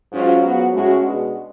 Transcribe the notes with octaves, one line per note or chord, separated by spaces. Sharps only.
G#2 F#3 C#4 F4
G#2 F#3 B3 F#4
A2 G#3 C#4 F#4
B2 G#3 D4 F#4